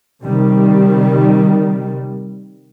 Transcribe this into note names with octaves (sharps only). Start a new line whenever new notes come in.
C3 D#3 G3